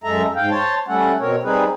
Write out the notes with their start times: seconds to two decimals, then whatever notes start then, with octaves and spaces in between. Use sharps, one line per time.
0.04 F#2 G#3 A4 E5 A#5
0.35 G#2 F5 G5
0.50 C5 C#5 A5
0.88 G3 A3 C#4 A4 F#5
1.20 B2 C4 A#4 C#5
1.43 G3 C4 D#4 G#4 B4